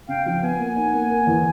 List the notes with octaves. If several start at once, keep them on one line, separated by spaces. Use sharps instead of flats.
C#3 F5 G5
F3 F5 G5
B3 F#5 G#5
A#3
D#4
A#3
A#3
E2